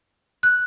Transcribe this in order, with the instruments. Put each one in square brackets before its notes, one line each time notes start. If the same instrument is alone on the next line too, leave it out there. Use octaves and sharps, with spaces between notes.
[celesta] F#6